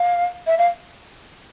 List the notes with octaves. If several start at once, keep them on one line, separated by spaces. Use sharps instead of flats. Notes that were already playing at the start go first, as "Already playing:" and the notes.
Already playing: F5
E5
F5